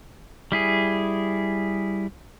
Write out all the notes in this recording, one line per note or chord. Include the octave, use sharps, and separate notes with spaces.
G3 E4 G#4